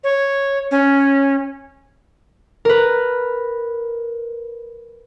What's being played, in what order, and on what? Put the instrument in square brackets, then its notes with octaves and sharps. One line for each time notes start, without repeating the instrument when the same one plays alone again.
[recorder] C#5
C#4
[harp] A#4 B4